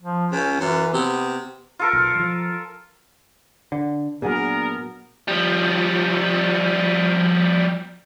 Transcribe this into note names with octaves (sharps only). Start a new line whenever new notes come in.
F3
C#2 C#4
F#2 E3
C3 B3
F4 A4 A#4
B1
E3 F3
D3
A#2 F#3 B3 D4 G#4 A#4
F3 G3